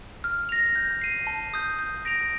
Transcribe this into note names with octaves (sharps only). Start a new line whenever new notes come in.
F6
A#6 F7
G6
C7 D#7
A5
D#6 G6
G6
A#6 D7 F7